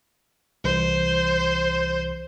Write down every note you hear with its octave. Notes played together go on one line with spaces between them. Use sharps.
C2 E3 C5